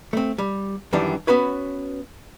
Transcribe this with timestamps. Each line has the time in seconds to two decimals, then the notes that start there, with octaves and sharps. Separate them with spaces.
0.13 A3 C4
0.38 G3
0.93 F#2 D#3 E3 G3 D4
1.27 B3 C#4 F#4 B4 C#5